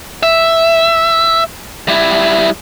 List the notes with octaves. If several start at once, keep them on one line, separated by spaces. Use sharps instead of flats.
E5
G3 E4